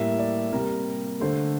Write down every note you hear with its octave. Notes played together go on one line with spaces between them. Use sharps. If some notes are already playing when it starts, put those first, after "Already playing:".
Already playing: A2 G3 A#3 E5
D5
C3 G3 A#3 A#4
D3 A3 C5